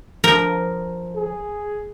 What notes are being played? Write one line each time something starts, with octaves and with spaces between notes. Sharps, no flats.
F3 A#4
G#4